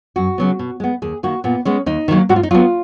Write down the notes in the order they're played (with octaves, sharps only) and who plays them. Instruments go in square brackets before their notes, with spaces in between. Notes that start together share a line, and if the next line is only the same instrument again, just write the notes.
[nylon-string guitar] F#2 F#4
C#3 F#3 B3
B2
G#3 B3
D#2 G#4
D#3 A#3 F#4
A#2 B3
G#3 B3 C#4
D#2 D#4
D#3 F#3 A#3
G#2 F#4
F4
D#4
F#3 B3 F4